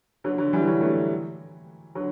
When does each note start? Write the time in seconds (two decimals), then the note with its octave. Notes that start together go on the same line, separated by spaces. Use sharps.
0.24 D3 F#3
0.38 D3 F#3
0.53 E3 G3
0.67 D3 F#3
0.81 F#3 A3
1.95 D3 F#3